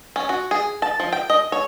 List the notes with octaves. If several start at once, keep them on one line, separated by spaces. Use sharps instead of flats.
C#4
F#4
G#4
A5
F3
G5
D#5
C#5